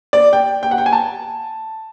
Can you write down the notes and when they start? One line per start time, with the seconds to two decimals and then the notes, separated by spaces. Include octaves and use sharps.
0.13 D5
0.33 G5
0.63 G5
0.71 F#5
0.78 G5
0.86 G#5
0.93 A5